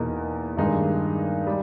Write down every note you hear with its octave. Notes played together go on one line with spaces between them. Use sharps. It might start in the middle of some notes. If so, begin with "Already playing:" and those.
Already playing: E2 B2 A#3 D#4
G2 D#3 G#3 D#4
G3